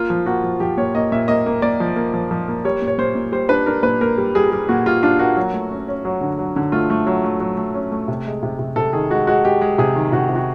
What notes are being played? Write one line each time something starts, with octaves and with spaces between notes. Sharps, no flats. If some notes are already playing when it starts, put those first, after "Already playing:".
Already playing: A#3 F4
F3
A#3 F#4
F3
F3 G4
A#2 C#5
A#3 D#5
A#2 E5
A#3 D#5
A#3
A#3 D5
F3
A#3
F3
F3
A#3
G3 C#5
A#2
C#5
A#2 C5
A#2
G3 C5
D4 B4
D4 A#4
A#2 B4
A#3 A#4
G3
G3 G#4
G3
A#2 F#4
G3 F4
D4 F4
A#3 F#4
F#3
A3
C#4
C#4
F#3
D3
F#3
D3
A3 F4
A3
F#3
A3
F#3
A3
C#4
A3
C3
G#3
C3
C3
C3 A4
D#3 G#4
G#3 F#4
G#3 F#4
G#3 G4
G#3
C3 G#4
D#3
C3 F#4
C3
F#4